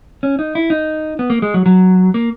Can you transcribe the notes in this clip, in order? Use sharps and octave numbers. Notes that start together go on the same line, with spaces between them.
C#4
D#4
E4
D#4
B3
A#3
G#3
F#3
F#3
A#3